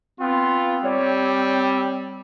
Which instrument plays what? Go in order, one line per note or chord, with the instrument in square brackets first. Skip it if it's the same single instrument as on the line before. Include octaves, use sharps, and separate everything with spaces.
[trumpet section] B3 F4 [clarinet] C4
[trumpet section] G3 [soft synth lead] C#5